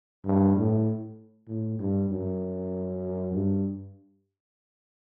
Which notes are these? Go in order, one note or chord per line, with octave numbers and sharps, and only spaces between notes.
G2
A2
A2
G2
F#2
G2